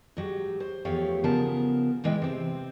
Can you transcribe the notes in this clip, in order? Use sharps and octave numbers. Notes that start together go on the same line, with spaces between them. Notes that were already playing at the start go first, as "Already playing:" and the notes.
G#2 F#3 G4
C5
E2 F3 A3 G4 C#5 F5
C#3 F3 B3 A#4 A5
A#2 E3 G#3 E4 G5
C3 C4